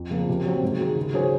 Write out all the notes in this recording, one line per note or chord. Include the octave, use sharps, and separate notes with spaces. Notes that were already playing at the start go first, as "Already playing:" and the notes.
Already playing: F2
C#3 F3 A#3
C3
F#3 C4
G#2
D#3 G#3 D#4 F#4
C#3
F#3 C#4 G#4 C5